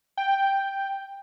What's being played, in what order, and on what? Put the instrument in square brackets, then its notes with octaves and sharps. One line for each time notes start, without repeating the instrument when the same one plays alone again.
[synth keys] G5